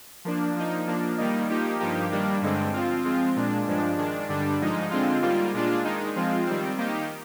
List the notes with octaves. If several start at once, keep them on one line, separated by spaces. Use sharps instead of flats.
F3 A#3 D4
F3 A#3 D#4
F3 A#3 D4
D#3 G3 A#3 D#4
F3 A#3 D#4 G4
G2 F3 A#3 D#4 G4
D#3 G3 A#3 D4
G2 D3 G#3 C4
F3 C4 F4
F3 G#3 C4 F4
A#2 G#3 D4
G2 F3 G#3 D4
D#3 G#3 D4
G2 D3 G3 D4
G#2 F3 G#3 D#4
D3 G#3 C4 F4
G#2 G3 A#3 F4
A#2 G#3 D4 F4
D#3 G#3 D#4
F3 G#3 C4 F4
D#3 G3 C4
D#3 A#3 D#4 G4